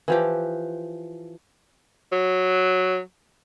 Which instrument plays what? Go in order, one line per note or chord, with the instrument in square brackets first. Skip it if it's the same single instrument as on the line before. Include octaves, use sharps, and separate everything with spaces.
[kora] E3 F3 G4
[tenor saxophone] F#3